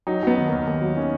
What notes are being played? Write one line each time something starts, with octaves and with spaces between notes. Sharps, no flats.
F#3 D#4
F#3 B3
D#3
D#2 A#3
D#2 A#3
F#3
D#3 C#4